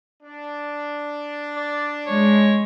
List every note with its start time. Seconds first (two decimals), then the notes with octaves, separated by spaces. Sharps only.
0.23 D4
1.56 D5
2.06 G#3 C#5